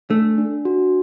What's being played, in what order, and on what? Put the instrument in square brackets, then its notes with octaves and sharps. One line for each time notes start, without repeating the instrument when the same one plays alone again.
[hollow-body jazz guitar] A3 [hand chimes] D4
[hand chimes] D4
F#4